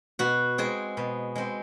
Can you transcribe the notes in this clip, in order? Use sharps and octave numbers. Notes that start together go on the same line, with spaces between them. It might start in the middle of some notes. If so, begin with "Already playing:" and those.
B2 F#4
G#3 C4 G#4
B2
G#3 C4